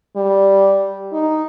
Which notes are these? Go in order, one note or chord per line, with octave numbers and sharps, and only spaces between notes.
G3
D#4